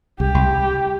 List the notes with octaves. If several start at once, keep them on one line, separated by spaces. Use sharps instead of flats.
C2 G4
C2